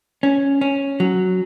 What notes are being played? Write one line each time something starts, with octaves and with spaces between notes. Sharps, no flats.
C#4
C#4
F#3